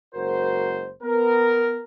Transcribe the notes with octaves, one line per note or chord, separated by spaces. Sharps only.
F#1 G#3 F#4 A#4 C5
B3 A#4